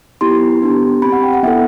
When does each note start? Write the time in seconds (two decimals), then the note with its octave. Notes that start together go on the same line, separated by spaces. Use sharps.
0.21 B3 E4 G4 C6
0.62 B3 D4 G4
1.02 C4 G4 B5
1.12 F#5
1.23 G5
1.33 F#5
1.43 B3 E4 A4 E5